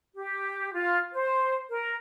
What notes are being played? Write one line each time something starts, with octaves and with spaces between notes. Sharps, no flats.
G4
F4
C5
A#4